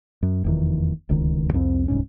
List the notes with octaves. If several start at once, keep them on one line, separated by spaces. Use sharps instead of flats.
F#2
F1 E2 D#3
D1 C#2 D#3
C2 F2 C4
D1 C2 G#2 C#4